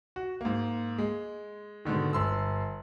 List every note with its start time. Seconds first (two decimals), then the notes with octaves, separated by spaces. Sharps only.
0.16 F#4
0.41 G#2 A#3
0.98 G#3
1.85 G#2 B2 D3 D#3
2.13 G1 C6 E6